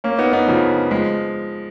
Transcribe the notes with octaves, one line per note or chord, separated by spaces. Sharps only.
A#3 C#4
B3 D#4
B3 D#4
C#3 F3
F3 G#3